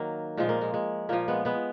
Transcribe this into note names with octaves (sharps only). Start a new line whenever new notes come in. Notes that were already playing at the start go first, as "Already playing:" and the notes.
Already playing: D#3 F#3 A#3
A#2 F3 G#3
A#3
G#3
G#3
A#2 F3 A#3
G#3 B3
G#3 B3